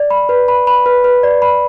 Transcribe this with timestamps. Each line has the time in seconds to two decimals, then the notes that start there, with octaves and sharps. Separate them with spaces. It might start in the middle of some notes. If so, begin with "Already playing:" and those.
Already playing: D5
0.11 B5
0.29 B4
0.48 B5
0.67 B5
0.86 B4
1.04 B4
1.23 D5
1.42 B5